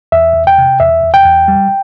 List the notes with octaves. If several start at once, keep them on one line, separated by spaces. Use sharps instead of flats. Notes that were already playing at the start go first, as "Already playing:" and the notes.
E2 E5
E2
G5
C3
E2 E5
E2
G5
E2
G3